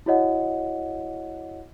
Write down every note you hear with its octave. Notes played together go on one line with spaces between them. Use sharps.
E4 F#4 C#5 D#5 F#5